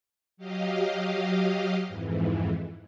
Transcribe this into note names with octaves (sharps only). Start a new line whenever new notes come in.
F#3 G4 D#5 F5
F2 G#2 E3